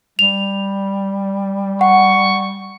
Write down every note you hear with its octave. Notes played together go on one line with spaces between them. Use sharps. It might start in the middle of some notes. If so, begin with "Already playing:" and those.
G3 F7
F#5 C#6